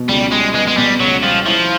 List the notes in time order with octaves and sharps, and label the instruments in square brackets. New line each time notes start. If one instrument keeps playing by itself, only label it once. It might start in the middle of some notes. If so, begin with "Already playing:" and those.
Already playing: [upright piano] B2 B3
[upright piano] C#2 [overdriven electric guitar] G3
[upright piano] G3 [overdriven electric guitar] G#3
[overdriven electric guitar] G#3 [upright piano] B3
[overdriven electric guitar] G#3
[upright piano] B2 [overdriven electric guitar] G3
[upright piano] C#2 [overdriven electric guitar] F#3
[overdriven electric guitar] F3 [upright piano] G3
[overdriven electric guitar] F3 [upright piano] E4